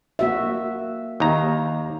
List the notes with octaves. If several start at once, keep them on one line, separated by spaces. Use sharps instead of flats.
A#3 F#4 E5
D#2 A#5